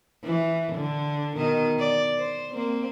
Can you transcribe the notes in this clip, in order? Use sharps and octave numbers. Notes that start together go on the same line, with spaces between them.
E3
D3
B2 D#3 D#5
D5
C5
A#3 C4